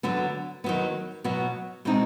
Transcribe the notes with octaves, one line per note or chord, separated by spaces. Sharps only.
D3 F#3 B3
D#3 F#3 B3
B2 F#3 B3
B2 G#3 C4 D#4